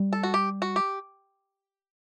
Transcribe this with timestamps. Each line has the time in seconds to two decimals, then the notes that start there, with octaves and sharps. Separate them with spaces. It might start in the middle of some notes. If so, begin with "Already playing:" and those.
Already playing: G3
0.13 A4
0.23 F#4
0.34 G4
0.62 F#4
0.76 G4